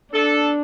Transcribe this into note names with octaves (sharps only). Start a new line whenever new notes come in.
D4 A4